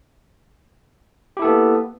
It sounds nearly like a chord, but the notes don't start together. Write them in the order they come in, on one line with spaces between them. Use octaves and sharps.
G4 E4 A4 B3 A#3